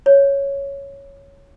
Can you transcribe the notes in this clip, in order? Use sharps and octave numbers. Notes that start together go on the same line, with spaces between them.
C#5